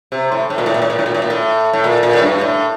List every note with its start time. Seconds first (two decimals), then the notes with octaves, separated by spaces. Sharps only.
0.12 C3
0.32 A2
0.50 A2
0.58 A#2
0.66 A2
0.74 A#2
0.82 A2
0.90 A#2
0.99 A2
1.06 A#2
1.14 A2
1.22 A#2
1.30 A2
1.73 A2
1.84 A#2
2.03 A#2
2.13 A2
2.22 G2
2.41 A2